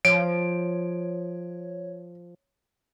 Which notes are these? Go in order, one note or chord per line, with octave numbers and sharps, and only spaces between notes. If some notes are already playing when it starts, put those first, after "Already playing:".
F3 C#5 D7